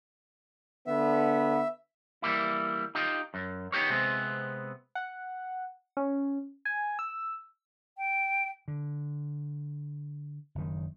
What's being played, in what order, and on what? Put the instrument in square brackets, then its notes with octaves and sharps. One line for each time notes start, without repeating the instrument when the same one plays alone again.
[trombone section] D3 B3 [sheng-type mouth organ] E5
[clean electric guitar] E3 G3 A#3 E4
D#4 F4 G4
F#2
B3 D#4 G4 A#4 C#5
C3 G#3 B3 C4
[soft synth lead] F#5
C#4
G#5
E6
[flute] G5
[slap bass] D3
F#1 D#3